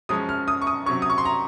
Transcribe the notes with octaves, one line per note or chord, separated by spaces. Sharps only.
F#2 F3 G#3 C#4 D#6
F6
D#6
C#6
D#6
C3 F#3 C#4 C#6
D#6
C#6
C6
A#5